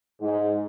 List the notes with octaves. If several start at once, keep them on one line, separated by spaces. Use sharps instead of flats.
G#2